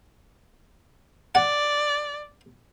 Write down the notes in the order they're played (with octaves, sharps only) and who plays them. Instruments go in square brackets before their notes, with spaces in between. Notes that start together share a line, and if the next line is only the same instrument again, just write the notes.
[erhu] D5 [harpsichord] F#5